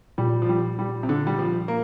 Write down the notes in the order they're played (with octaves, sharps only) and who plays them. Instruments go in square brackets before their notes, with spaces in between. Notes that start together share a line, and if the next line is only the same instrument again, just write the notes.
[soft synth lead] A#2 [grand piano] G3
[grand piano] F3
G3
G3
C3
D3
G3
F3
A#3